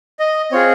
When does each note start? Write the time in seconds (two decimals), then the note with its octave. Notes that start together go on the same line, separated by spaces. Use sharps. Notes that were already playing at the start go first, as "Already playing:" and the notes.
0.19 D#5
0.52 C4 F4 G#4 C#5